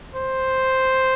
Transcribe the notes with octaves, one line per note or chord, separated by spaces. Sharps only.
C5